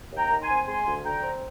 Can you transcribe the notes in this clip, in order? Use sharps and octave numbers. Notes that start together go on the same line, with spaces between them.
D#2
G5 A#5
D#3
G#5 C6
C4
G#3 G#5 C6
D2
D3 G5 A#5
C4